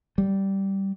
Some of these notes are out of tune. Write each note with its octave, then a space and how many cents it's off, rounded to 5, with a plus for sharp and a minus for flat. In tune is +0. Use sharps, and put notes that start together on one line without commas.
G3 -10